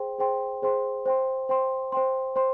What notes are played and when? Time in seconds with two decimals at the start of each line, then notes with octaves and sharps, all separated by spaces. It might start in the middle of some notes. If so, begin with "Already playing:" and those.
Already playing: G#4 C5 G5 C6
0.19 G#4 C5 G5 C6
0.62 G#4 C5 G5 C6
1.06 C5 G5 C6
1.49 C5 G5 C6
1.92 C5 G5 C6
2.36 C5 G5 C6